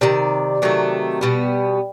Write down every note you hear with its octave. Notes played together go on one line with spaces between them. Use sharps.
C3 D#3 D5
C3 D#3 F#3 A3
B2 G3 B3